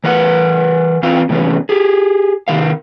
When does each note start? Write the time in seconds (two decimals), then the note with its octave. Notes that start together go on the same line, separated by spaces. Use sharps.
0.04 E3 A#4 B4 F#5
1.02 E2 E3 C4 F4 F5
1.29 A2 C3 E3 F#3 B3 C#4
1.69 G4 G#4
2.48 C3 D#3 A#4 F5